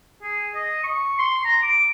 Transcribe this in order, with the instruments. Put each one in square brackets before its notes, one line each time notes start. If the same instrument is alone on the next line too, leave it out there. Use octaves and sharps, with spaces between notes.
[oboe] G#4
D#5
C#6
C6
A#5
D6